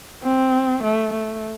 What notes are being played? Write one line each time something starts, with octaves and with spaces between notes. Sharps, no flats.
C4
A3
A3